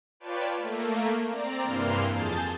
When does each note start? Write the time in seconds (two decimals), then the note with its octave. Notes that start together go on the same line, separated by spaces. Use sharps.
0.20 F4 B4 C#5 D5 G5 A5
0.57 A3 A#3
1.30 C4 D5 A#5
1.61 G2 C3 E3 A#3 C6 F6
2.09 F2 G#4 A5 G6 A6